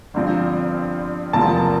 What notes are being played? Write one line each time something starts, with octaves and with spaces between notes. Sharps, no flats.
G1 G2 F3 C4
F1 E2 C3 F3 A#3 A5